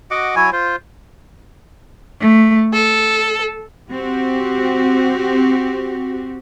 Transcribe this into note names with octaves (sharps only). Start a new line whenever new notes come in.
F#4 D#5 F#5 D6
F#3 E4 C#5 G#5
F4 C5
A3
A4
C4 F#4 G4